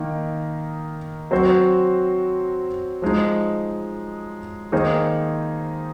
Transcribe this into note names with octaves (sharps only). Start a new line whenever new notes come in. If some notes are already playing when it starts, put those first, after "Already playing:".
Already playing: D#3 A#3 D#4
F#3 C4 F#4 C5
F3 G#3 D#4
D#3 A#3 D#4 G#4 C5